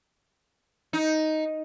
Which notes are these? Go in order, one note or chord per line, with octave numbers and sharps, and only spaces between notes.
D#4